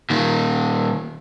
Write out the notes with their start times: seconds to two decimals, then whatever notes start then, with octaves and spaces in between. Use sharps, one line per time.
0.10 A#2 D#3